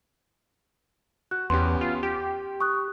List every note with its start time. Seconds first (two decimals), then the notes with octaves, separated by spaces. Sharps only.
1.31 F#4 F#6
1.50 E2 B3 C#4 G4 C6
1.81 F4
2.03 G4 G5
2.60 C#6 D#6 F#6